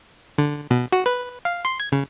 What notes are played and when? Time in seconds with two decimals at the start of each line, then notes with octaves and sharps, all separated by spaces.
0.38 D3
0.70 B2
0.93 F#4
1.06 B4
1.45 F5
1.65 C6
1.80 G#6
1.92 C#3